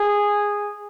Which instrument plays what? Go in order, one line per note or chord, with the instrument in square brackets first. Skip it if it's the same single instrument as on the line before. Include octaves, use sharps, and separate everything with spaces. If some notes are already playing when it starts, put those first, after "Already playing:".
Already playing: [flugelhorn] G#4